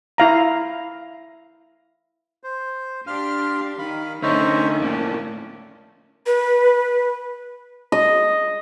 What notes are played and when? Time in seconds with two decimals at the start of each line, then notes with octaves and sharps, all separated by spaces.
0.18 E4 F5 A#5
2.43 C5
3.07 D4 G4 F5 C6 F6
3.78 D#3 F5 B5
4.22 D3 A3 C#4 D#4 C5 C#5 E5
4.82 F2 A2 A#3 C#4 D4
6.26 B4
7.92 D#5